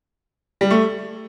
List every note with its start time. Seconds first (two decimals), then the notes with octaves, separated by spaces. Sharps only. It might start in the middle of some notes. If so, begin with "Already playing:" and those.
0.61 G3
0.70 A3